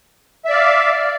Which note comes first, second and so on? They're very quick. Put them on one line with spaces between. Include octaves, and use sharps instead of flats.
E5 D5 F5